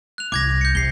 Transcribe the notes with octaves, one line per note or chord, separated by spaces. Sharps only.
F#6 F7
C2 D6 G#6 A#6
G6 C#7
C3 C7 G7